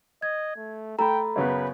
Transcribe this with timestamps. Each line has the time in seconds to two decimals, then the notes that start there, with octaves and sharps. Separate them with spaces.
0.22 D#5 G#6
0.56 A3
0.99 A3 G5 A#5 B5
1.36 F#2 C#3 B3 B4